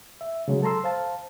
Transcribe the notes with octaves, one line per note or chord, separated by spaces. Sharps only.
E5
C#3 F#3 G#3
A4 A5 A#5 C6 E6
C5 F5 A5